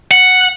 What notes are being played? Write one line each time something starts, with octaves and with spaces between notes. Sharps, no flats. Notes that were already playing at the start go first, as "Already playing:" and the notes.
F#5